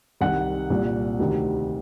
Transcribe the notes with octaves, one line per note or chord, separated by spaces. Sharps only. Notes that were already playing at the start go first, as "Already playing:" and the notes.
C2 C3 D#3 F#5
C2 A#2
D2 C3 D#3